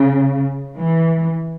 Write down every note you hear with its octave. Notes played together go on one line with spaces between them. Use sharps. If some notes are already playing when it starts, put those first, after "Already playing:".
Already playing: C#3
E3